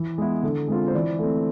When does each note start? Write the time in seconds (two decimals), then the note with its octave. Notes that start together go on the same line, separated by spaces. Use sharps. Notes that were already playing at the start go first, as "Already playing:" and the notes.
Already playing: E3
0.18 G#3 B3 E4
0.43 D3
0.68 G#3 C4 F4
0.88 C5
0.94 E3 D5
1.19 A3 C4